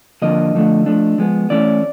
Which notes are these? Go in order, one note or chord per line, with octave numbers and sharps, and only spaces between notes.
D3 F3 A#3 D4 D#5
D3 F3 A3 D4
F3 A3 D4
F3 G#3 B3
E3 A3 C#4 E4 D5